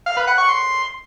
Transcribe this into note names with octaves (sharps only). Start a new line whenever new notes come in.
F5
B4
F#5
C#6
C6